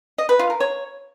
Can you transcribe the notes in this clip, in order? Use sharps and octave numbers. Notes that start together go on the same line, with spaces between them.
D#5
B4
F4
A#4
C#5